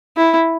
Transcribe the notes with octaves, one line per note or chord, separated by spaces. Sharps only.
E4